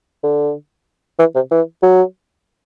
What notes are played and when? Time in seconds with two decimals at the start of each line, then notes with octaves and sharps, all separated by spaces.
0.23 D3
1.19 E3
1.35 C3
1.51 E3
1.83 F#3